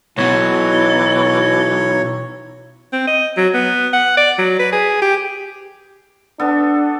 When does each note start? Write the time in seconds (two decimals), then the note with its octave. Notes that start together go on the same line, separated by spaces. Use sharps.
0.18 B1 B2 E3 C#5
2.93 C4
3.07 D#5
3.37 F#3
3.54 B3
3.93 F#5
4.17 D5
4.38 F#3
4.59 B4
4.72 G#4
5.02 G4
6.39 B3 D4 A4